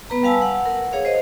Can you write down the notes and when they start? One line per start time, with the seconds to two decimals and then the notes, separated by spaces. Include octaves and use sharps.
0.10 B3 B4 A#5
0.23 G3 B4 F5 G#5 A5 E6
0.42 F#5
0.66 A#4
0.93 G#4 C#5 F5
1.05 C5 D#5